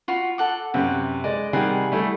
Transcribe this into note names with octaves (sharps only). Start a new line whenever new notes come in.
F4 F#4 B5
A4 F#5 D6
F#2 C3 B4
G#3 D5 D#5
C3 D#3 G3 G#4 F#5 G#5
G3 A3 E4